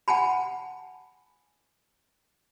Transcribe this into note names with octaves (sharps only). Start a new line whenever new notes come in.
F#5 G#5 A5 B5